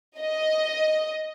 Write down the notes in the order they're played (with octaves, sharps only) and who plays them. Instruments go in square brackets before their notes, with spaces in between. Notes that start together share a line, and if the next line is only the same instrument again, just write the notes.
[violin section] D#5